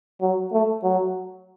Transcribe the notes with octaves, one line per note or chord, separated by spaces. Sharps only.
F#3
A3
F#3